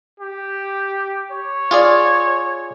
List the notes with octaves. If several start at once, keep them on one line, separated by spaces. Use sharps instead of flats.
G4
C#5
F4 G#4 D5